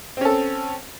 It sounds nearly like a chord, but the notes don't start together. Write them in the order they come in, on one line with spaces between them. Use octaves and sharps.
C4 C#4 A4